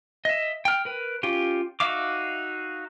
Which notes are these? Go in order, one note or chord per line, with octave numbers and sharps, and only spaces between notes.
D#5 E5
G5 F6
A#4 B4
C#4 F4 G4
D#4 F#4 E5 F5 D6